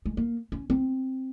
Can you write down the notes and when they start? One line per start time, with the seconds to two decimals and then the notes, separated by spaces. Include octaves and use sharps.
0.06 G#3
0.17 A#3
0.52 C#4
0.70 C4